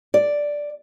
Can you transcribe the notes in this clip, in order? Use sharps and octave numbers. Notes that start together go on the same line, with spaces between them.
D5